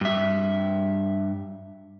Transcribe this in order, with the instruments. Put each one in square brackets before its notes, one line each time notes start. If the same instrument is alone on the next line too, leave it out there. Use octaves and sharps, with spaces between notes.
[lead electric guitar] G2 E5